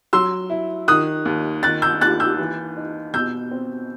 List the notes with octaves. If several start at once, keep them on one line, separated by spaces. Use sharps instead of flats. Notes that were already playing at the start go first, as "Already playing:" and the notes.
F#3 C6 E6
E4
D#3 D#6 F#6
D#2
D#3 F#6 A6
E6 G6
D#2 F#6 A6
E6 G6
E3
D#4
B2 E6 G6
C4